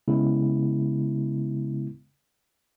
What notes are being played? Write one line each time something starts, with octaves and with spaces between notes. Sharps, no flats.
C#3 G#3 B3 E4